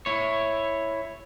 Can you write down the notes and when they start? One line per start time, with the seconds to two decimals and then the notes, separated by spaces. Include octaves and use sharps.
0.06 E4 C#5